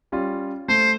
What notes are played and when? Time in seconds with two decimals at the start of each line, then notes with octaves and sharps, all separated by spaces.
0.12 G3 C#4 F4
0.69 A3 C5